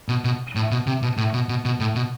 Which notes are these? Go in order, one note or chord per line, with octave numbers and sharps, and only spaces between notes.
B2
B2
A2
B2
C3
B2
A2
B2
B2
B2
A2
B2